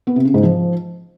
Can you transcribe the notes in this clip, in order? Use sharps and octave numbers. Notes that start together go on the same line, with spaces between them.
B3
C3
C#3
G#2
F3